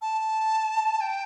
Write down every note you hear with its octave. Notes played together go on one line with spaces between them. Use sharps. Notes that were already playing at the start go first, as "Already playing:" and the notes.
A5
G5